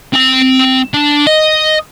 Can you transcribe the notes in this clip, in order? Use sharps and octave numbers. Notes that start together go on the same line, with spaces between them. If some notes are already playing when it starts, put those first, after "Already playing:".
C4 G5
D4
D#5